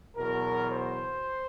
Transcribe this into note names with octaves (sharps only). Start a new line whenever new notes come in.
E2 B2 F#3 A#4
C5